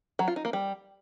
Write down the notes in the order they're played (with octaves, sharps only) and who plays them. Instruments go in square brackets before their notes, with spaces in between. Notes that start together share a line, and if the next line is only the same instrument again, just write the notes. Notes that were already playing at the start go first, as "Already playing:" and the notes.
[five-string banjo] F#3
F4
D#4
A#3
G3